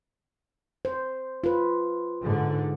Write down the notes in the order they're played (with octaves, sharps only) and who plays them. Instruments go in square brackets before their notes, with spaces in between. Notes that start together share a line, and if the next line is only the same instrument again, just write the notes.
[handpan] C5
F4 B4
[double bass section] G#2 D3